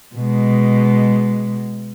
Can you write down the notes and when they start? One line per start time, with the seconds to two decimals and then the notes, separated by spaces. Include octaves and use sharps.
0.16 B2 G#3